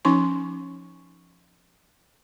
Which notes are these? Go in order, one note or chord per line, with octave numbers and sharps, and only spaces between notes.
F3 C#4 D#4 C6 C#6